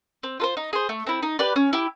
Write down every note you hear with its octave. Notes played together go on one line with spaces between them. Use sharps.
C4
F4 A4 C5
D#4
G#4 C5
A3
C4 E4
D#4
G4 B4 D5
C#4
E4 G4